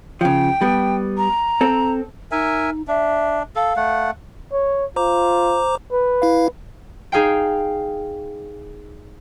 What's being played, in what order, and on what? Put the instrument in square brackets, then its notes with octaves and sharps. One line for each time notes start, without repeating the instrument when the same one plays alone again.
[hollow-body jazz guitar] C#3 F3 [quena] G5
[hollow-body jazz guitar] G3 B3
[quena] A#5
[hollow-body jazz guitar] C4 A4
[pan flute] D#4 [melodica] A#4 E5 G#5
[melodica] D4 [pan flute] E5
[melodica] A4 [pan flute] F5
[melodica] A3 F#5
[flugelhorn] C#5
[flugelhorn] F4 [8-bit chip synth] C5 A#5 D6
[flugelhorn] B4
[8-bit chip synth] E4 F5
[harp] D#4 G#4 F5 G5